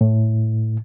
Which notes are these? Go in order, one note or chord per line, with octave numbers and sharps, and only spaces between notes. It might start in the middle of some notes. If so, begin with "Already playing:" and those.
A2